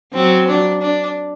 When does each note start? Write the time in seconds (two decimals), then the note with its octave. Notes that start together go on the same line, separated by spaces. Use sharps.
0.14 F#3 C4
0.48 D4
0.82 D4